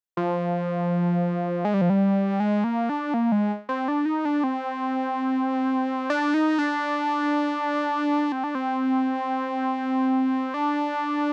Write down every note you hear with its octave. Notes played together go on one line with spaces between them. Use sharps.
F3
G#3
G3
F3
G3
G#3
A#3
D4
A#3
G#3
C4
D4
D#4
D4
C4
D4
D#4
D4
C4
D4
C4
D4